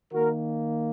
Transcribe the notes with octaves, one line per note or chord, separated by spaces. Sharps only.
D#3 A#3 F#4 A#4